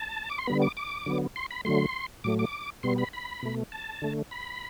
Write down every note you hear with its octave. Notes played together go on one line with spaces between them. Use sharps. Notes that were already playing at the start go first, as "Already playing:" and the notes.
Already playing: A5
D6
C6
D3 G3 B3 B5
D6
D6
D3 F#3 B3
C6
B5
D3 F#3 A3 C6
A2 F#3 A3 D6
D6
B2 G3 B3 C6
B5
B5
B2 A3
A5
D3 A3
B5